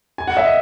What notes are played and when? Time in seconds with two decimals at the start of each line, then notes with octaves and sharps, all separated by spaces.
0.18 G#5
0.27 F#5
0.37 E5
0.45 D#5